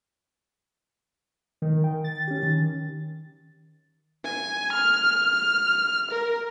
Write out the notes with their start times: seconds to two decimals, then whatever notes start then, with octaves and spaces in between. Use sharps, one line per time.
1.62 D#3
1.84 G5
2.04 A6
2.28 C#4 G4
2.43 D#3
4.24 G#5
4.73 F6
6.11 A#4